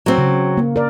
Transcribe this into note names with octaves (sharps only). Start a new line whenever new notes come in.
F#3 C4
C#3
A#3
A#4 D5